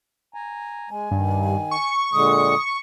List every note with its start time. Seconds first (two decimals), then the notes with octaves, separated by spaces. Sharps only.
0.34 G#5 A#5
0.90 G#3 G#5
1.11 G2 D#3
1.71 C#6
2.13 A#2 D3 G#3 D#6